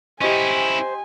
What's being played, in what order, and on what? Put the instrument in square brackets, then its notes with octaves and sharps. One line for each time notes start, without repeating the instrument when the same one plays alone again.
[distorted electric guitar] C#4 E4 [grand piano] G4 D#5 [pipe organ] C5 [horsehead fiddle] G#5